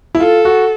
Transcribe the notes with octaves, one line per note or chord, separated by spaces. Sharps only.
E4
F4 A4
F#4